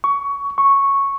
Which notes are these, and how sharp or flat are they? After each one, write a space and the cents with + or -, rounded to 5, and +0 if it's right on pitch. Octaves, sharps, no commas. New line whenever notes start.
C#6 +20
C#6 -5